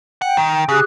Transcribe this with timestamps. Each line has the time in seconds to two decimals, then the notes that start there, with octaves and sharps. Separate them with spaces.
0.22 F#5 G5
0.37 D#3
0.69 C#3 G4 G#4 F#6